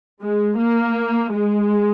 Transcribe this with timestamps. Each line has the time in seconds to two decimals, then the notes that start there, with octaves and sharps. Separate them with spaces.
0.22 G#3
0.59 A#3
1.32 G#3